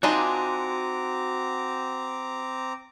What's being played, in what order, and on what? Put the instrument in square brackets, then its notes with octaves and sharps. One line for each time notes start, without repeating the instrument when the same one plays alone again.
[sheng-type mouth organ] C4 A#5 D6 [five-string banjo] D4 D#4 F4 [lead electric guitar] F#4 G#5